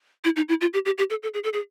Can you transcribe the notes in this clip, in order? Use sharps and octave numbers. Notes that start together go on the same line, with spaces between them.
E4
D#4
E4
F4
G4
G4
G4
A4
A4
G#4
A4
G#4